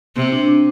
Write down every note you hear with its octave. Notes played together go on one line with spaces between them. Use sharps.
C3 C4
D4
D4